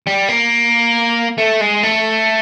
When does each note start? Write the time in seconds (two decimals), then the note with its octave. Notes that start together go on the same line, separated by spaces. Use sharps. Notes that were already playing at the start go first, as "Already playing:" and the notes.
0.07 G3
0.28 A#3
1.38 A3
1.61 G#3
1.83 A3